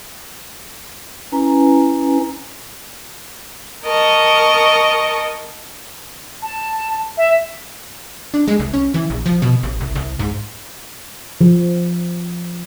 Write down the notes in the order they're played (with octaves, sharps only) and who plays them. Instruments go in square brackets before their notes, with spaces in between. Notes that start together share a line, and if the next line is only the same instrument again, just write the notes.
[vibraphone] C#4 E4 B4 G#5 A#5
[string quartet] A#4 D#5 A5 C#6
[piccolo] A5
E5
[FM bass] D4
G#3
C2
C#4
E3
A#1
F3
B2
A1
C2
C2
G#2
[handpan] F3